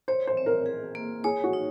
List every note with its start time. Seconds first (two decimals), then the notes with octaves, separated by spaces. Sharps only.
0.08 C5 C#5
0.27 C5
0.37 C4
0.46 A#4
0.66 G#4
0.95 A#3
1.24 G#4 C#5
1.44 F#4
1.53 D#4